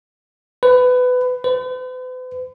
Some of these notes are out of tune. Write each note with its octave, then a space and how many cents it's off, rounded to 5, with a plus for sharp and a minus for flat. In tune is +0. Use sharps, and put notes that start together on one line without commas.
B4 +20
B4 +45